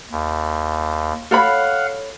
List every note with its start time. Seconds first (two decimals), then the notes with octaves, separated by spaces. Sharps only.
0.11 D#2
1.31 A4 C#5 F5 F#5 B5